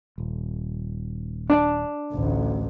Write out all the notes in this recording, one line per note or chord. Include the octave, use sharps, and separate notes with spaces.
D#1
D4
A1 D2